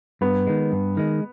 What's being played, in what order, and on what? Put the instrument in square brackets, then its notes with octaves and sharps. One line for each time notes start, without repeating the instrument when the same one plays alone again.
[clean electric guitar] G2 [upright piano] B3
[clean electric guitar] D#3 G#3
G2
D#3 G#3